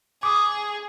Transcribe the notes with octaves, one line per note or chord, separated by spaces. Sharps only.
G#4 D6 D#6